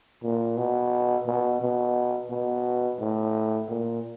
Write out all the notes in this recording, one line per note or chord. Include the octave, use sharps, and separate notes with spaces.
A#2
B2
B2
B2
B2
A2
A#2